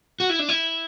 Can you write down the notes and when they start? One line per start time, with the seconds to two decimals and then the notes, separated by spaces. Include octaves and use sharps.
0.20 F#4
0.30 E4
0.39 D4
0.49 E4